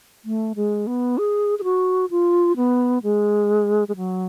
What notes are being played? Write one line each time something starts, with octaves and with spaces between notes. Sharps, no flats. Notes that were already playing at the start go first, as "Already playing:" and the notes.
A3
G#3
B3
G#4
G#4
F#4
F4
B3
G#3
G#3
F#3